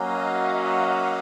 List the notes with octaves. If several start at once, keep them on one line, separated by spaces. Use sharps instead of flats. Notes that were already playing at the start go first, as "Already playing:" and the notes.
Already playing: F#3 A#3 C#4 F#4 D#5 F5
E5 F#5